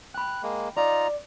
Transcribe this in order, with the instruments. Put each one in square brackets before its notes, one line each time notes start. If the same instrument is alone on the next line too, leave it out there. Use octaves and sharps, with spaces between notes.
[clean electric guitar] G5 B5 [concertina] F#6
[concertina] G#3 A#3
[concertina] D#4 F4 A#5 [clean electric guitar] D5